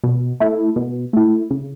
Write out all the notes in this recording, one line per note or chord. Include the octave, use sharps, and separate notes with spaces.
B2
A3 E4
B2
A3 E4
C#3